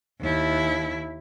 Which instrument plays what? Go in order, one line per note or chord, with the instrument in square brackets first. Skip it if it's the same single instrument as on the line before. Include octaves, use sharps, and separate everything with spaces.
[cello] D#2 E4